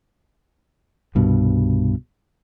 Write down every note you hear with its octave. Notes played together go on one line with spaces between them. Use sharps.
C2 G2 B2